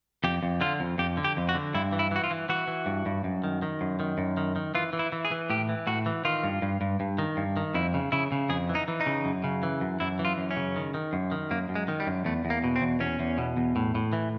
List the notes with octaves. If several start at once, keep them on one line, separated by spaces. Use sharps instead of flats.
F2 G4
F2
D3 F4
F2
F2 G4
D3
G4
F2
F#4
D3
G2 E4
E3
E4
E3 F#4
F4
E3
E3 F#4
E3
G2
G2
F#2
D#3
D#3
F#2
D#3
F#2
D#3
D#3
E3 F4
E3
E4
E3
G#4
E3
A2 G4
E3
A2 F#4
E3
D#3 F4
G2
G2
G2
G2
D#3
G2
D#3
F2 E4
C#3
C#3 E4
C#3
F2 G#4
E3
D#4
E3
D#4
C#3
F#2
C#3
E3
F#2
F#2 E4
E3
F4
F#2
C#4
C#3
D#3
D#3
F#2
D#3
F#2 A#3
F#2
G#3
D#3
G3
F#2
E2 A3
E2
A#3
B2
C4
E2
E2 C#4
E2
B2
E2
A2
A2
E3